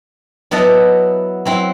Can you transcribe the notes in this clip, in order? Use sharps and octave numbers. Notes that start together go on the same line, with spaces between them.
F#3 B3 E4 D#5 F#5 A5
F#3 C4 E4